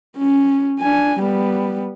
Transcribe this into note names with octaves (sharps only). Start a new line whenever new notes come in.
C#4
D4 G#5
G3 B3